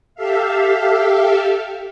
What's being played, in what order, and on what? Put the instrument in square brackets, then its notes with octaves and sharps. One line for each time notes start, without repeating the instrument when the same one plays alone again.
[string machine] G4 A4 E5 F5